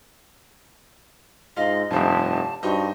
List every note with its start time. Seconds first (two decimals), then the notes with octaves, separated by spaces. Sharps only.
1.57 G#2 F4 D#5 F5
1.91 F1 G2 F3 A5
2.63 G2 D#4 F#4 C5 D#5